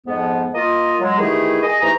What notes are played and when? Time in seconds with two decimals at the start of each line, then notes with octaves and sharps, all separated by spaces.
0.07 F2 G#2 F3 G#3 B3
0.55 A#3 F4 D#5
1.01 F#3 G#3
1.19 D#3 E3 A3 E4 G4 G#4
1.63 G#4 D#5
1.82 G#2 E3 A3 G4 A#5